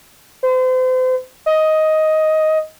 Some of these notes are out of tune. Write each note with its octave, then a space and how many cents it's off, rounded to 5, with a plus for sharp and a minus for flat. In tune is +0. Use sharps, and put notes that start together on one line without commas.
C5 -35
D#5 +10